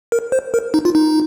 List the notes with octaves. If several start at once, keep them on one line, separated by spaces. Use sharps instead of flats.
A#4
C5
A#4
D#4
F4
D#4